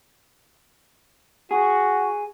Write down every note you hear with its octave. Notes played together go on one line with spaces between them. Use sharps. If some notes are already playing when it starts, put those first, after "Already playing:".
F#4 G#4